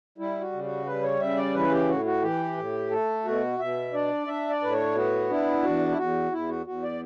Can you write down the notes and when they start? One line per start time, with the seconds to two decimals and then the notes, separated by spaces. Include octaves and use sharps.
0.18 G3 E4
0.41 F#4
0.52 C#3
0.64 F#4
0.86 G3 B4
1.03 C#5
1.20 C#3 E5
1.37 D5
1.54 E3 B4
1.71 G4
1.89 A2 F#4
2.05 F#4
2.22 E3 G4
2.57 A2
2.91 A3 A4
3.25 B2 F#4
3.59 B2 E5
3.93 D4 D5
4.27 D4 E5
4.50 D5
4.61 A2 B4
4.73 C#5
4.95 B3 F#4
5.30 D4 E4
5.63 E2 F#4
5.92 E4
5.97 E2 F#4
6.32 E2 E4
6.49 F#4
6.66 E2 F#4
6.83 D5